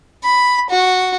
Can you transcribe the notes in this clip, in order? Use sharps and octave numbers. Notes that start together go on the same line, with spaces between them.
B5
F#4